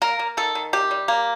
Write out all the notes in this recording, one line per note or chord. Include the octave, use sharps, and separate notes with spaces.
A#3 A#4
A#3
D#3 A4
D#3
C3 G4
G3
A#3